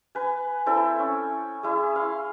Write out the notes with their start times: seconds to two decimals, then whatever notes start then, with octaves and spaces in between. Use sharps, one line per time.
0.15 B4 G#5
0.66 C4 E4 A4 G5
0.99 C#4
1.63 E4 G#4
1.96 F5 C6